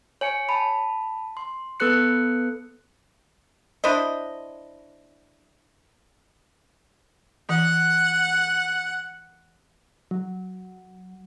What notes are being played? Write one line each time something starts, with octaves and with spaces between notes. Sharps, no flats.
C#5 G#5 C#7
A5 B5
C6
B3 A4 B4 F#6 C#7
D4 E4 C5 D#5
E3 F#5
F#3